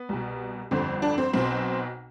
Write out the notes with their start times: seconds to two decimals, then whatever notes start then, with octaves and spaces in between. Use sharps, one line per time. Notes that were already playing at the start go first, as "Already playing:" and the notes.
Already playing: B3
0.09 C2 B2
0.71 G1 F2 D3 C4
1.02 D4
1.18 C4
1.33 B1 B2 C4